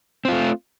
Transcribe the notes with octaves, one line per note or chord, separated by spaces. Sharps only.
A3 C4 F4